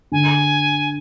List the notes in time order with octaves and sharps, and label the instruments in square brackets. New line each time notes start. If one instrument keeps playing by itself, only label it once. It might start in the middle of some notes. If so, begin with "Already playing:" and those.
[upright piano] D3 [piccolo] G#5